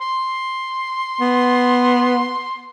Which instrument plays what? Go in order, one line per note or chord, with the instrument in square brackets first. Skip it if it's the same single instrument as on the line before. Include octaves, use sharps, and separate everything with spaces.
[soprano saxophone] C6
[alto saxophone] B3